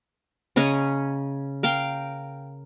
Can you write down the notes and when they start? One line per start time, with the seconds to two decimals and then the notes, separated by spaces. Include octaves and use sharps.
0.56 C#3 C#4 D#5 A#5
1.63 A#4 F5 G5